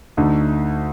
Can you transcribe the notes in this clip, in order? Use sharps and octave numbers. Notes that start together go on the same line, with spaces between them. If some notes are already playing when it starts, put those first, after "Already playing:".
D2 D3 A3 D#4